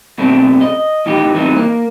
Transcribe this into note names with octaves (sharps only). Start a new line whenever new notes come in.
F#2 B2 A3 C4 D4
D#5
A2 E3 D#4 G4
E2 A2 E3 F#3 C4 D#4
A#3